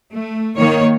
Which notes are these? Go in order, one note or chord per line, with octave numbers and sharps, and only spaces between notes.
A3
D#3 A#3 C#5